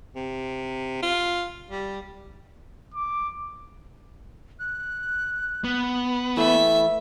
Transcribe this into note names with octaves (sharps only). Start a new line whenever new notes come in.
C3
F4
G3
D6
F#6
B3
E3 A3 E5 B5